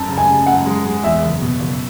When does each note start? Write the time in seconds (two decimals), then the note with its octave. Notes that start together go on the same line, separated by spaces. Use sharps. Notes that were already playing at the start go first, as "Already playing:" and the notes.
Already playing: F#2 A5
0.09 C#3
0.18 G#5
0.28 C#3
0.46 F#2 F#5
0.66 G#3
0.85 G#3
1.03 E2 E5
1.22 F#1
1.41 B2
1.60 F#1